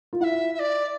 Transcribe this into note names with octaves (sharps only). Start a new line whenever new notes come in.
F4
E4 E5 F#5
E5
D5